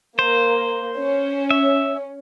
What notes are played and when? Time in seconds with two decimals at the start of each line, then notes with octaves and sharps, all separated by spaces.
0.19 A#3 C5
0.98 C#4
1.51 E5